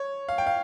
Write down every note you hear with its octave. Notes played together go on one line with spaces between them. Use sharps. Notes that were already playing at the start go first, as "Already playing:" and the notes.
Already playing: C#5
F5
G5
F5